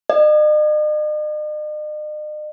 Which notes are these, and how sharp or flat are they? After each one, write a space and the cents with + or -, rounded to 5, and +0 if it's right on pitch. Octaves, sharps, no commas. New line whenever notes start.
D#5 -45